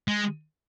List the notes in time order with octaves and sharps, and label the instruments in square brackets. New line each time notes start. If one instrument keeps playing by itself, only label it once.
[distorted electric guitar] G#3